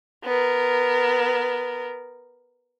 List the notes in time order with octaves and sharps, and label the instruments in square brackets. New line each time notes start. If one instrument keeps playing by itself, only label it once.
[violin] B3 A#4